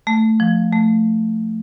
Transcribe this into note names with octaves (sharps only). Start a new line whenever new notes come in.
A3
F3
A3